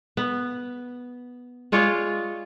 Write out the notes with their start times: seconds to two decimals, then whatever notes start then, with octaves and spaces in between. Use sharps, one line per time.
0.17 B3
1.72 G#3 F4 C#5 D5